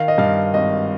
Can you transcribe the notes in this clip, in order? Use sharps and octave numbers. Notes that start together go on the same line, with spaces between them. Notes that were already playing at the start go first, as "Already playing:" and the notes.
Already playing: D#3 F5
D#5
G2 F5
G#1 D#5